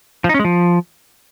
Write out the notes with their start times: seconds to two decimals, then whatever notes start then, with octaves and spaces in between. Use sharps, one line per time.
0.24 F3
0.29 D#4
0.34 C#4
0.39 G#3
0.44 F3